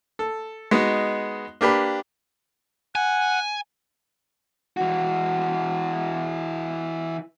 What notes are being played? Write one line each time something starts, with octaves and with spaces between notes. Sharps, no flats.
A4
G#3 B3 D#4 F#4
A#3 D4 G4 B4
F#5 G#5
E3 F#4